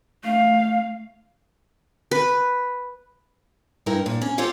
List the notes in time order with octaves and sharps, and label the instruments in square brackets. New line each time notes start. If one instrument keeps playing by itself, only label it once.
[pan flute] A3 [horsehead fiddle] F5
[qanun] B4
[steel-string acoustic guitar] G2 E4 A#4 G5
A#2
C#4
F4 G4 A4 C#5 D5 F5